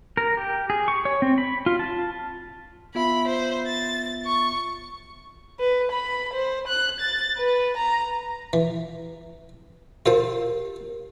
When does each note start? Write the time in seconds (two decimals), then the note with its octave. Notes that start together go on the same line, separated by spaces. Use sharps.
0.17 A#4
0.37 G4
0.70 G#4
0.88 C#6
1.05 C#5
1.22 C4
1.38 B5
1.66 F4
1.79 A5
2.95 B3 F4 E5 B5
3.28 C5
3.67 A6
4.25 C#6
5.60 B4
5.92 B5
6.33 C5
6.67 F#6
7.00 A6
7.38 B4
7.77 A#5
8.53 E3
10.06 F4 G4 A#4 C5 A5